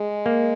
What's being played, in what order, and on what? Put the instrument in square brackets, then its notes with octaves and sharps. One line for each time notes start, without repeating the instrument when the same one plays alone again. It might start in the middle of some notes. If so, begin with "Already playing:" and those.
Already playing: [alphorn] G#3
[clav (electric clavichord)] A#3